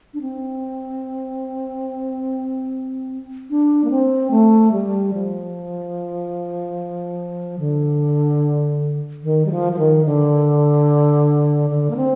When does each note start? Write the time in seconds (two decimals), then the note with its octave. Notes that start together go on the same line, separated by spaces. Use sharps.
0.14 D4
0.21 C4
3.50 D4
3.85 A#3
3.90 C4
4.31 A3
4.72 G3
5.14 F3
7.59 D3
9.23 D#3
9.46 G3
9.51 F3
9.73 F3
9.79 D#3
10.05 D3
11.70 D3
11.90 A#3
11.96 C4